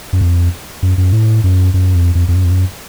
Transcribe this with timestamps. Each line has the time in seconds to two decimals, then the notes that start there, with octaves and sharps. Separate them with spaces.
0.13 F#2
0.21 F2
0.83 F#2
0.98 F#2
1.13 A2
1.44 F#2
1.74 F#2
1.95 F2
2.15 F2
2.28 F2
2.35 F#2
2.44 F2
2.51 F#2